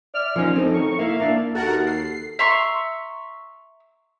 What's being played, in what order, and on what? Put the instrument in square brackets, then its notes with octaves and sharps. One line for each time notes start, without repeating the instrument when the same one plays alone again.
[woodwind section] D5 E5 F6
[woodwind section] D#2 A#2 C#4 [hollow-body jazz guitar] F3 D#4
[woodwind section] D2 F3 [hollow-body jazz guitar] C4 D#4
[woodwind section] A2 A#4 C#6
[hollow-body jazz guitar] A#3 E4 [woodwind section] E5 F5
[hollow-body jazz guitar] A#3 D4
[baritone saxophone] D#2 [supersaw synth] F#4 A#4 F#5 [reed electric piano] A4 A6
[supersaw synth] C7
[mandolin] E5 A#5 C6 C#6